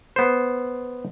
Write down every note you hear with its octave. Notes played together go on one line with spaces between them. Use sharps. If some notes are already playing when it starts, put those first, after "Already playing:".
B3 C5